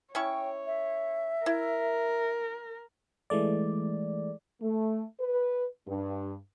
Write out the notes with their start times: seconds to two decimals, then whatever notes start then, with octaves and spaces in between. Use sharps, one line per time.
0.15 C#4 E4 C#5 G5 C#6
0.67 E5
1.46 E4 A#4
3.30 E3 G#3 A3 D5
4.62 A3
5.20 B4
5.88 G2